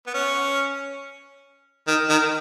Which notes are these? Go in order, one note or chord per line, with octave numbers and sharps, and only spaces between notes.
B3
C#4
D#3
D#3